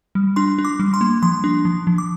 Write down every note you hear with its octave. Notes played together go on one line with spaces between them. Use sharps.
G3
D4 C6
D4
D6
G3
C6
A#3
F3 C6
D4
F3
F3
D6